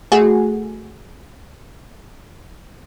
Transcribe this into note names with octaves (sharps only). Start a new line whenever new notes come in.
A3 F#4 G#4